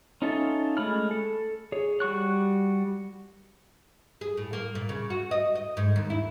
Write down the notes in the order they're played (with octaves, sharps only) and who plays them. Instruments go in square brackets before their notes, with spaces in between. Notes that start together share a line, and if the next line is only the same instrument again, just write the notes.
[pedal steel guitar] C#4 D#4 F4 A4 E5
G#3 A3 B5 F6
A4
G#4 C#5
G3 F#4 C#6 F#6
[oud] G#4
A2
A#3
A#2
C#3
F#4
D#5
D#5
G#2
D#2
E4